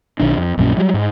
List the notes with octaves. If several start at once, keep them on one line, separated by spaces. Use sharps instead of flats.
B1 D#3 D4
F2
A#1 F#2 A#2 C#4
F#3 G3
G#2